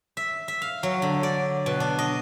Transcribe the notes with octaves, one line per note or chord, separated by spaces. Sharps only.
E5
E5
F5
F#3
D3
D5
B2
D4
D#5